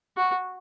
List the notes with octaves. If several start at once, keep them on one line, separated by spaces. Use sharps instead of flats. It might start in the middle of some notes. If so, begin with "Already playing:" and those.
F#4